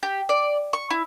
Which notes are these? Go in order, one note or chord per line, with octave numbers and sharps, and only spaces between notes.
G4
D5
C#6
E4